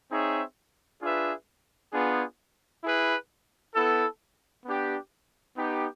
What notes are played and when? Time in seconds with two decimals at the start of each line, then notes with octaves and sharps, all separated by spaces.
0.11 C4 D#4 G#4 C#5 E5
1.02 D4 F4 G#4 B4 E5
1.92 B3 D4 F4 G#4
2.83 E4 G#4 B4
3.74 B3 E4 A4
4.65 B3 D4 G4
5.56 B3 D#4 G4